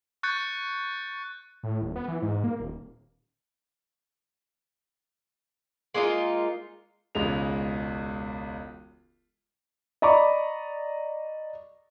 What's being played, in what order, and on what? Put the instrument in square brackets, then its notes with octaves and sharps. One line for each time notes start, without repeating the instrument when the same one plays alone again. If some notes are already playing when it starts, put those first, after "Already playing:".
[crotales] C#6 F#6 G6 A6 C#7
[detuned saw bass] A2
D#1
B3
E3
G#2
A#3
D#1
[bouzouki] G#3 A#3 D#4 F4
[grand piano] E1 C#2 G#3 F7
[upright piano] D5 D#5 A#5 B5 C#6 D6